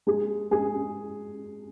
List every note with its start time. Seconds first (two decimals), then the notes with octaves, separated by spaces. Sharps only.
0.07 G#3 G#4
0.51 G#3 G#4